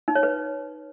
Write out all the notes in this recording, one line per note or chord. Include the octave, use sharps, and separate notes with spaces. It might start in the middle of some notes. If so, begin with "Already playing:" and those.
D#4
C#5
B4